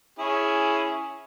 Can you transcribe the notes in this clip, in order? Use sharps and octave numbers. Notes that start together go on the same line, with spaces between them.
C#4 E4 G#4